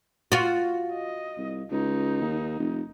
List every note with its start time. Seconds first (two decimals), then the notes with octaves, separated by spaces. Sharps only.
0.32 F4 F#4
0.93 D#5
1.38 C2
1.71 C#2 D#4
2.21 D#2
2.59 F1